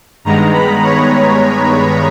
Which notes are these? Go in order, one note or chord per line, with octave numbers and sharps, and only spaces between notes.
G2 D#3 G#3 B3 A#5
B5
C#5